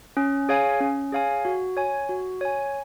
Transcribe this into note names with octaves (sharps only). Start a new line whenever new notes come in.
C#4
G#4 C#5 F5 G#5
C#4
G#4 C#5 F5 G#5
F#4
C#5 G#5
F#4
C#5 G#5